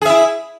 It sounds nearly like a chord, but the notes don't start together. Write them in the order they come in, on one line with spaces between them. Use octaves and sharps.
G#4 E5 E4